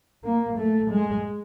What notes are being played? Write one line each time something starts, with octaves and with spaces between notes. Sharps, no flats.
A#3
A3
G#3